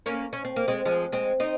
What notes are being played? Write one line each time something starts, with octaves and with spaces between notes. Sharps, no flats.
A#3 C#4
C#4
C4
A#3
G#3 C4
F3 G#3
G#3 C4
C4 D#4